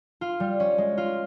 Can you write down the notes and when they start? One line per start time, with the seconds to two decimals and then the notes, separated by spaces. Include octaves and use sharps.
0.21 F4
0.40 G3
0.60 C#4
0.78 G#3
0.97 F4